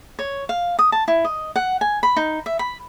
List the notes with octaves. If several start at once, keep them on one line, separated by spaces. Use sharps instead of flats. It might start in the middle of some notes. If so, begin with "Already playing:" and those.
C#5
F5
D#6
A5
E4
D#5
F#5
G#5
B5
D#4
E5
B5